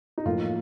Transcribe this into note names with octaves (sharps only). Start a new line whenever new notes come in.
D#4
A2 F3 A#3 F4